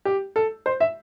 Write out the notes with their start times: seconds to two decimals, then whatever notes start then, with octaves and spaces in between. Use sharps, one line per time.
0.05 G4
0.36 A4
0.66 C5
0.80 E5